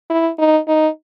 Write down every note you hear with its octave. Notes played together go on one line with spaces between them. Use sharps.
E4
D#4
D#4